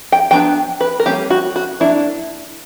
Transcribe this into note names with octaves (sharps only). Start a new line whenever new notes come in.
G5
F#3 B3 D4 G5
B4
A#4
G3 A#3 C#4 G4
F#4
F#4
F#3 A#3 D4 E4